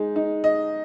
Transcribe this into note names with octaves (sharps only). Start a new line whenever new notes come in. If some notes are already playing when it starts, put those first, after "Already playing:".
Already playing: G#3 D#4
D#4
D#5